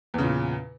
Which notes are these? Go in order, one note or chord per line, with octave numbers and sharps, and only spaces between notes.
E2 A#2 C#3